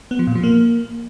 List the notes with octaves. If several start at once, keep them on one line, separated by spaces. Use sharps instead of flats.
B3
F3
A#2
F3
A#3